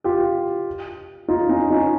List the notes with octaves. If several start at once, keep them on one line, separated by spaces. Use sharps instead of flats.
F4 G4
D#4 F4
C#4 D#4
C#4 D#4